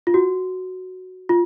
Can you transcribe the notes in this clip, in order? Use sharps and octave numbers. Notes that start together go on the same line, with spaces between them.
F4
F#4
F4